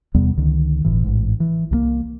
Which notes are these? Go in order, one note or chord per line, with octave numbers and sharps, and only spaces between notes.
E2 C3 G3 B3
C#2 D3 D#3
G1 A2 E3
A1 G#2
E3
C2 F3 A#3